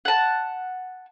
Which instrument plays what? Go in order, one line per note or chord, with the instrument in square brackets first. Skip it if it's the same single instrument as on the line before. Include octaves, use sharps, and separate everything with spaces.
[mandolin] F#5 A5